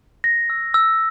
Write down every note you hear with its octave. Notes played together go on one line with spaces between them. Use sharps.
A#6
E6
E6